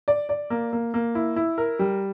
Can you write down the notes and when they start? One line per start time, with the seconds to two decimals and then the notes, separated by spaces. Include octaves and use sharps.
0.08 D5
0.29 D5
0.50 A#3
0.73 A#3
0.94 A#3
1.15 E4
1.36 E4
1.58 A#4
1.79 G3